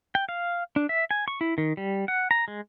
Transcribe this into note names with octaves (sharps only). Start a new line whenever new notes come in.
G5
F5
D4
E5
G#5
C#6
E4
D#3
G3
F#5
A#5
G#3